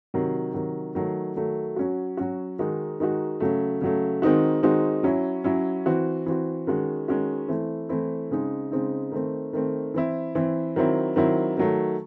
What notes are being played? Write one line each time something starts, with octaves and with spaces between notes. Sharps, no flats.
C3 D#3 F#3
C3 D#3 F#3
D#3 F#3 A3
D#3 F#3 A3
F#3 C#4 F#4
F#3 C#4 F#4
D#3 G#3 D#4 F#4
D#3 G#3 D#4 F#4
C#3 F#3 A3
C#3 F#3 A3
D#3 G#3 C4 D#4 F#4
D#3 G#3 C4 D#4 F#4
F#3 C#4 E4
F#3 C#4 E4
E3 C4 F#4
E3 C4 F#4
D#3 G#3 C#4 F#4
D#3 G#3 C#4 F#4
E3 A3 C4 E4
E3 A3 C4 E4
C#3 G#3 C4 D#4
C#3 G#3 C4 D#4
D#3 A3 C4
D#3 A3 C4
E3 C4 E4
E3 C4 E4
D#3 F#3 C4 E4
D#3 F#3 C4 E4
D#3 F#3 A3